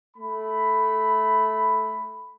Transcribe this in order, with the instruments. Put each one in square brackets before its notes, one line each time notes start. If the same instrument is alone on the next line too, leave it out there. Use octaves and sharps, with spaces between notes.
[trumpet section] A3 B5